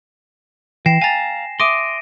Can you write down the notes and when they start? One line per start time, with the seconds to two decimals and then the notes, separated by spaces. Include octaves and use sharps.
0.86 E3 G5 A#6 C7 E7
1.02 F5 G#5 A#5 A6
1.60 E5 C6 D6 D#6 A#6 D7 D#7